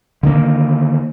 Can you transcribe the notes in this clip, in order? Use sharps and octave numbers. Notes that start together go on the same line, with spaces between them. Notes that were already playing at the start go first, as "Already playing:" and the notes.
D3 D#3 A#3